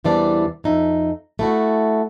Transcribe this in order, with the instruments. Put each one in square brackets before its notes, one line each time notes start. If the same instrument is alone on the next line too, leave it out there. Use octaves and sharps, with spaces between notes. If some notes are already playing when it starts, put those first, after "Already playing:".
[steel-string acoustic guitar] E2 C3 E3 G3 D4 D5
F2 D#4 E5
A3 E4 F#4